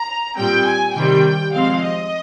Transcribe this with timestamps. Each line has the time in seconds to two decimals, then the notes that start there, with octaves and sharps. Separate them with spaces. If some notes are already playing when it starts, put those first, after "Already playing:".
Already playing: A#5
0.36 A#2 G3 C4 G5
0.66 G#5
0.94 C3 D#3 G3 C4 G5
1.54 F3 G#3 C4 F5
1.82 D#5